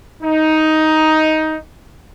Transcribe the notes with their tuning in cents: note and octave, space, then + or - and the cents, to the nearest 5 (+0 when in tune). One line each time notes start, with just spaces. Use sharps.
D#4 +10